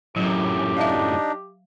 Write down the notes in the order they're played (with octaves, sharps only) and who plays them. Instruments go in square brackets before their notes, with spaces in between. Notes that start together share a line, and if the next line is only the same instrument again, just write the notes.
[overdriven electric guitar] F#2 A2 [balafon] F#3 [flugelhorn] G4
[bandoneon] D4 D#4 [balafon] E5 F5